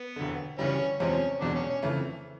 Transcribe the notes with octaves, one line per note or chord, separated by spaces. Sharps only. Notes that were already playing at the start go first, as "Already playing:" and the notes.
Already playing: B3
E1 D2 D3
D2 C#3 E3 G3 C#4
E2 C3 F3 G#3 C4 C#4
E1 E2 B2 G#3 D4
C#4
C#4
F2 C#3 E3 A3